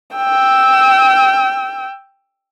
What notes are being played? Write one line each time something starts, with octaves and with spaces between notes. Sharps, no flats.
G5 E6